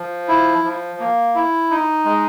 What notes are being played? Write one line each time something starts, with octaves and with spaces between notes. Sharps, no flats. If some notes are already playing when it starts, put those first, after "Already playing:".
Already playing: F3
E4
F3
A#3
E4
D#4
G#3